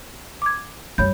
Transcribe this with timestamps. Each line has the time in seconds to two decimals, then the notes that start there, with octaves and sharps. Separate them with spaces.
0.42 D6 G#6
0.98 F#2 G3 C#5 B5 G6